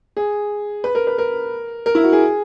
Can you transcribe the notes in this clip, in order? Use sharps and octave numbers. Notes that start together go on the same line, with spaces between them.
G#4
B4
A#4
B4
A#4
A#4
E4
F#4
G#4